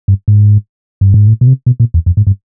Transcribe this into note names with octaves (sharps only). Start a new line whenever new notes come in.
G2
G#2
G2
G#2
A2
B2
C3
B2
A#2
E2
F2
G#2
G2